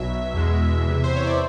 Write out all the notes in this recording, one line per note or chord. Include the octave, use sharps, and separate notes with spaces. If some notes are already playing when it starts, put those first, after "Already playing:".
Already playing: B1 B2 F#3 E5
E2 B2 G#3
E2 C3 E3
C5
C#5
D5